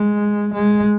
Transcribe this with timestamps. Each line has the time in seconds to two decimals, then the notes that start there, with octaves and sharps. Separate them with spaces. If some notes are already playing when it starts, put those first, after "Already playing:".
Already playing: G#3
0.54 G#3